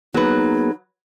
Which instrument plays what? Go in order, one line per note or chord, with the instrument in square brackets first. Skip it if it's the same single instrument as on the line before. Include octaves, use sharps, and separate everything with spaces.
[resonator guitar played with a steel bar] F#3 B4 [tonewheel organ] A#3 B3 G#4 [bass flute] D#4